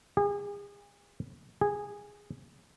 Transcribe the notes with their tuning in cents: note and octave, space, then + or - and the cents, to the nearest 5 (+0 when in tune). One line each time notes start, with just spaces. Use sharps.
G#4 -35
G#4 -10